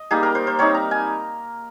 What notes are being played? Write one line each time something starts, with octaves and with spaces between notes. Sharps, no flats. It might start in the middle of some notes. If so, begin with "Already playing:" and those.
Already playing: D#5
G3 A#3 D#4 G#4
A#4
C5
C5
G3 C4 D#4 C#5
A#5
G#5